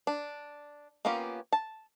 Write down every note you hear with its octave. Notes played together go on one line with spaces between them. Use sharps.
D4
A#3 B3 C#4 F4 G4
A5